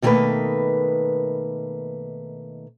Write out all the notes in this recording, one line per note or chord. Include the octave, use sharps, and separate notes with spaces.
B2 D#3 G3 A3 A#3 B4